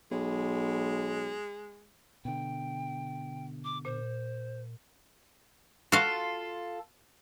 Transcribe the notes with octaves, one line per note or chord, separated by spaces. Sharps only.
B1 G#3
B2 D3 G5
D6
A#2 C5
F4 F#4 A4 F5